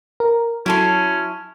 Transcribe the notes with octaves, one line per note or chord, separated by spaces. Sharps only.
A#4
F#3 C#4 E4 A4 C6